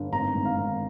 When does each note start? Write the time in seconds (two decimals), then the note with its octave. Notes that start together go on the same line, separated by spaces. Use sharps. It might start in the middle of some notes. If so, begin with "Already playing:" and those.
Already playing: G1
0.12 G#1 A#5
0.34 G#2
0.45 F5
0.57 G#1